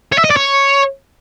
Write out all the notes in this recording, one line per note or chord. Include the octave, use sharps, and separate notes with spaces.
C#5
E5
D#5
D5
C#5